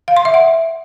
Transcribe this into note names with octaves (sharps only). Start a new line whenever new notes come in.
F5
C6
E5
F#5